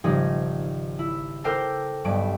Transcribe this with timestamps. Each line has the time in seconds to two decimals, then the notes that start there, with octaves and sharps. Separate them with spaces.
0.04 G#1 C#3 F3 G3 D#4 G#4
0.99 E4
1.44 A4 A#4 C5 G5 D6
2.04 B1 G2 G3 D7